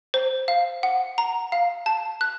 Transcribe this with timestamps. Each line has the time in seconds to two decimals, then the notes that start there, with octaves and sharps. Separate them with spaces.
0.14 C5
0.48 F5
0.83 F#5
1.18 A#5
1.52 F5
1.86 A5
2.21 F#6